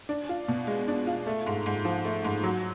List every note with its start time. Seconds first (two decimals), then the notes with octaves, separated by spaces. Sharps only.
0.09 D4
0.29 F4
0.48 B2
0.67 G#3
0.88 D4
1.07 F4
1.27 A3
1.46 G#2
1.66 G#2
1.85 F3
2.05 A3
2.24 G#2
2.44 F#3